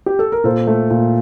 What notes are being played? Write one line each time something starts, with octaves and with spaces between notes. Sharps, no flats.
G4
A4
A#4
A#2 A4 C5
A3
A#2